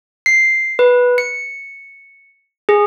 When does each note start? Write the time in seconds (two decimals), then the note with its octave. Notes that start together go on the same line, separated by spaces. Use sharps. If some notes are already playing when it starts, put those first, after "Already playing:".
0.26 C7
0.79 B4
1.18 C#7
2.69 G#4